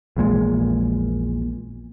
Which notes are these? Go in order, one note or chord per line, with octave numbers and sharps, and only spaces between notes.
A#1 E2 A#2 G#3